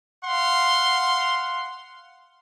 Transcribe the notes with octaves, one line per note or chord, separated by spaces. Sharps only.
F5 F#5 C6